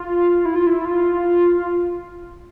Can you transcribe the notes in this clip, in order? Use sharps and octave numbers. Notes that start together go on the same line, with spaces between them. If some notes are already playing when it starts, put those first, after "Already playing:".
Already playing: F4
E4
F4
E4
F4